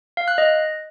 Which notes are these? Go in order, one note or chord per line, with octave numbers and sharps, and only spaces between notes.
F5
F#6
D#5